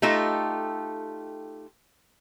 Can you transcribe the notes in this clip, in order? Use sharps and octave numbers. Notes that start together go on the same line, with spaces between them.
A3 D#4 F4 G4 A4